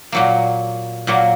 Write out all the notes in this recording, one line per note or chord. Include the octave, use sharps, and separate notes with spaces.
A#2 F#3 A#3
A#2 F#3 A#3